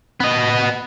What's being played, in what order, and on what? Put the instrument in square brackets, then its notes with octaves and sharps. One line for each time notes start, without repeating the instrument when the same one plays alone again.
[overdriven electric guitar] B3 D#5